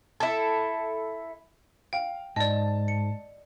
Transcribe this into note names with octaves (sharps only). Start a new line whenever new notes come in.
E4 A4
F5 G5
G#2 D5 D#5 A5
C#7